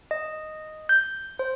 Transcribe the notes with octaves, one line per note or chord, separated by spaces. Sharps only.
D#5
G6
C5